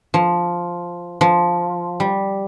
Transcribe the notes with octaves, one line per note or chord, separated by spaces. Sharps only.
F3
F3
G3